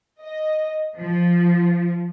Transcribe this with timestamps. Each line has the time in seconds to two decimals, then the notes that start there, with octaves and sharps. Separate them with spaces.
0.22 D#5
0.98 F3